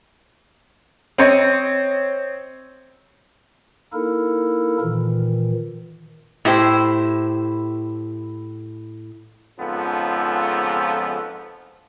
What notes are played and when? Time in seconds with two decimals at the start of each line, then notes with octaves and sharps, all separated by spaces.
1.18 C4 C#5 D#5
3.93 A#3 D#4 E4 A4 A#4
4.81 A#2 D#3 E3
6.45 A2 E4 G4 C5
9.59 F2 G#2 C#3 F3 B3 A4